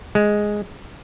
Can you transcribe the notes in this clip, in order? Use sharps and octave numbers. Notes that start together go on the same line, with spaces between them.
G#3